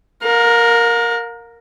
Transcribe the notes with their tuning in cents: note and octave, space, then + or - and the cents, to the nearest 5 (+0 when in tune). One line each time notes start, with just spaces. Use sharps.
A#4 +0 F5 +40